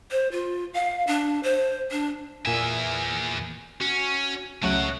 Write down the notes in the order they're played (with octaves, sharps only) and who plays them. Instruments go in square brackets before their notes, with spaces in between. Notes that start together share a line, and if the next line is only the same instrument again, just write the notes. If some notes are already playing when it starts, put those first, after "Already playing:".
[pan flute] C5
F4
F5
D4
C5
D4
[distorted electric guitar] E2 E5 [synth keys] A#2 G#5
[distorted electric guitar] C#4 [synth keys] F#4
[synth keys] C#2 F#3 A3 [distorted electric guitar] B2 F#5